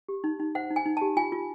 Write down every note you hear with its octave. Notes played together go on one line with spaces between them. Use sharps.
G4
D#4
D#4
C5 F#5
D#4
G#5
D#4
G4 A5
F4 G#5
F4